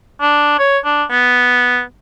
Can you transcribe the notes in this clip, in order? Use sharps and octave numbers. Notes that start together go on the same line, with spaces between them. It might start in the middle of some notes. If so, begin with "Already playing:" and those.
D4
C#5
D4
B3